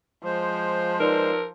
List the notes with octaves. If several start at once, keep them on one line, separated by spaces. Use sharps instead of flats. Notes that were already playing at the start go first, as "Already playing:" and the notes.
F3 G#3 C5
D#4 A#4 B4 D5